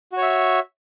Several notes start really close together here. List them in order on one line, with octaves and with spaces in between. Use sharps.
F#4 C#5 E5